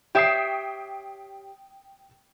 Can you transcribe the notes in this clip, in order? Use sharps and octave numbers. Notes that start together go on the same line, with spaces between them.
G4 C#5 E5 G5 D#6 C7